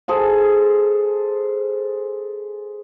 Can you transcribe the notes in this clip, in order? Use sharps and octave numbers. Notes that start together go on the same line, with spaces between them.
G#4 A4 C5 A5